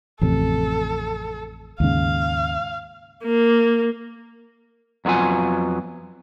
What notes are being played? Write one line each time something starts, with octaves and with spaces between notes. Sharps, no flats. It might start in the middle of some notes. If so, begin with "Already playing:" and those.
A1 F2 C3 A4
D#2 G#2 C#3 F5
A#3
F2 F#3 B3 F4 G#5